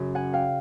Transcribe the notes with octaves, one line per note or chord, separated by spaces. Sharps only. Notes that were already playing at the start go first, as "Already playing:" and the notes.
Already playing: F#2 C#3 F#3
F#5 G#5
F5 G5